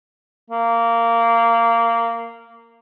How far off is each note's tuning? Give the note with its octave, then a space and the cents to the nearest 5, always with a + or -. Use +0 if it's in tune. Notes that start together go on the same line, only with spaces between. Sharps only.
A#3 -15